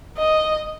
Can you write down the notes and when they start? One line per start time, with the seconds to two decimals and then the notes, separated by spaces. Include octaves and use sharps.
0.17 D#5